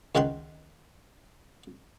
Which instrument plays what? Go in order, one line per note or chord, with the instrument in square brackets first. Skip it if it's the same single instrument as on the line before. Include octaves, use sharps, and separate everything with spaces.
[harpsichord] C#2 D#3 F#5 G5 C6